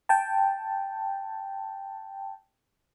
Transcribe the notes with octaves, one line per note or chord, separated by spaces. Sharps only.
G5 A5